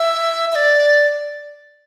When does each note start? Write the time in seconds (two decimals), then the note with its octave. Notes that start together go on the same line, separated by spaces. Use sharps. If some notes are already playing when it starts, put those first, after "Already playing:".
Already playing: E5
0.52 E5
0.55 D5